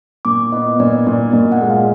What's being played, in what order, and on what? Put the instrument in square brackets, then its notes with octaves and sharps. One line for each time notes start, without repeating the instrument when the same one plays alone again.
[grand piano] A#2 [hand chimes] D6
[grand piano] B3 [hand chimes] D#5
[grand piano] A#2 [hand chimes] D5
[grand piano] A#2 [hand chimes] D5
[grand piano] A#2 [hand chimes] D#5
[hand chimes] F#5
[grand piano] G#3
[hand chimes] F5